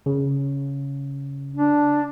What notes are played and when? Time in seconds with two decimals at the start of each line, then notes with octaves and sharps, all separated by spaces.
0.06 C#3
1.53 D4